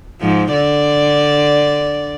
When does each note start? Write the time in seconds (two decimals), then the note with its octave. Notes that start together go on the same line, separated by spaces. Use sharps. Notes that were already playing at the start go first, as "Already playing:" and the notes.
0.21 G#2 F3
0.52 D3 D5